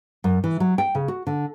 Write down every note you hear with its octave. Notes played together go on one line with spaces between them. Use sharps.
F#2
E3
F#3
G5
C#3
F#4
D3